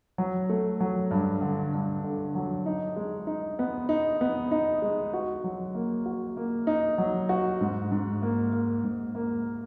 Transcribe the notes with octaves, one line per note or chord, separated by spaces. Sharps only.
F#3
A3
F#3
G2
D3
G2
D3
F#3
D#4
G#3
D#4
B3
D#4
B3
D#4
G#3
F#4
F#3
A#3
F#4
A#3
D#4
F#3
F#4
G#2
G#2
A#3
A#3
G#2
A#3